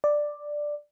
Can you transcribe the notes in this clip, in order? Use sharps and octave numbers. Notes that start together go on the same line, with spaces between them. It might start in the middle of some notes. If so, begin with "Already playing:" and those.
D5